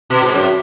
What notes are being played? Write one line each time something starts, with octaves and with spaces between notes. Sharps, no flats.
B2
G#2
F#2